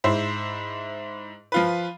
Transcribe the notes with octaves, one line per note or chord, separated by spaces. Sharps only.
G#2 E4 C5
F3 F4 B4